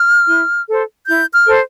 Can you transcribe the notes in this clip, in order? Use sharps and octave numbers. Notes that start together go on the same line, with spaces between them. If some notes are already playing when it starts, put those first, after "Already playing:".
Already playing: F6
E4
A4 C5
E4 G6
F6
A4 C5